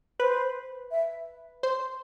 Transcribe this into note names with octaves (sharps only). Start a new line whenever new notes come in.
B4 C5
E5
C5